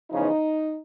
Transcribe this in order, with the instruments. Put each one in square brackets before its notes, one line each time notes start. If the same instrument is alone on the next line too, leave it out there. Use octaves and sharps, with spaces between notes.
[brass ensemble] E2 C#3 F3 D#4